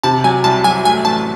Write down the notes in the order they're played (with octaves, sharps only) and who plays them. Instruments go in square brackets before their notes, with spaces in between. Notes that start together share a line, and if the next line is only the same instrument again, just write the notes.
[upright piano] C3 [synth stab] A5
[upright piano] F#3 [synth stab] G#5
[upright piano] C2 [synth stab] A5
[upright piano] F#3 [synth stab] G#5
[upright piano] A3 [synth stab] G#5
[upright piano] A1 [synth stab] A5